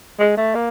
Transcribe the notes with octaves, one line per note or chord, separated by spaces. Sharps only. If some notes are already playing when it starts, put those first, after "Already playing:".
G#3
A3
A#3